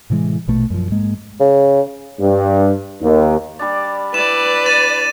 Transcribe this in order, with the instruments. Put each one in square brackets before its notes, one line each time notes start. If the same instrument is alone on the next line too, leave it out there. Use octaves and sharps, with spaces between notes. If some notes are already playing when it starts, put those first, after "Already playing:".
[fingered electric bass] A2 C3 E3 G#3
A#1 B2 A3
F#2 F3
G#2 G#3 A#3
[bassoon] C#3
[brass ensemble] G2
D#2
[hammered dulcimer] G3 D4 D5
[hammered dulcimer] E4 [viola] B4 D5 [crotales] E7
[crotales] A6 D#7 E7